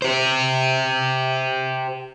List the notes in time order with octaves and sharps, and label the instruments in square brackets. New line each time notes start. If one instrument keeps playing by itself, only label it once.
[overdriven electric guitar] G4 C5